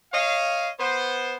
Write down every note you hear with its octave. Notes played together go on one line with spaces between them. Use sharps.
C#5 D#5 F5
B3 C5